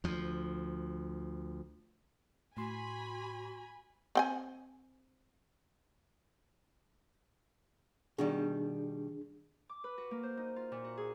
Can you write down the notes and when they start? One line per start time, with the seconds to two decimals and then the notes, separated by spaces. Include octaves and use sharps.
0.04 D2 F3
2.57 A2 F#4 G#5 B5 C6
4.15 C4 G5 G#5
8.18 B2 D#3 G3 D4 G#4
9.69 D6
9.84 B4
9.98 F#4
10.11 A#3
10.23 C5
10.37 D#4
10.56 F4
10.72 A#2
10.84 F#4
10.97 G#4